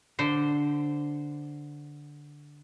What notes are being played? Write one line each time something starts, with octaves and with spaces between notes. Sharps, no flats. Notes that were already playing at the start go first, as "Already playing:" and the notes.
D3 C5